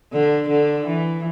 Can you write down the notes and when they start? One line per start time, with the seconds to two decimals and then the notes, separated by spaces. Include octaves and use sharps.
0.13 D3
0.49 D3
0.86 E3